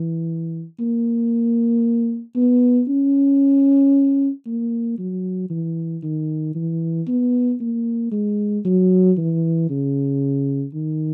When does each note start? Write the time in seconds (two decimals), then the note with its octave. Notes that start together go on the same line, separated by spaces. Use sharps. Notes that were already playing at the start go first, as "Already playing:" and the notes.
Already playing: E3
0.80 A#3
2.36 B3
2.89 C#4
4.46 A#3
4.98 F#3
5.50 E3
6.03 D#3
6.55 E3
7.08 B3
7.61 A#3
8.12 G#3
8.65 F#3
9.18 E3
9.70 C#3
10.74 D#3